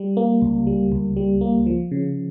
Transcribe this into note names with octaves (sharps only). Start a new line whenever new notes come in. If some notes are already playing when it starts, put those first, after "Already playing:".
Already playing: G3
A#3
C#2
G3
C#2
G3
A#3
F3
C#3